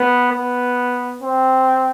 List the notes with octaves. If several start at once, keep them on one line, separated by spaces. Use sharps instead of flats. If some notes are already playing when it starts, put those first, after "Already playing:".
Already playing: B3
B3
C4